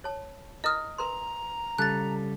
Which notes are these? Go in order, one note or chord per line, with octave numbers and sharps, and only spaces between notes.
C#5 A5
E4 A#4 D#5 D#6 F6
A#4 B4 A#5 C6
C#3 G3 A4 A5 F#6 A6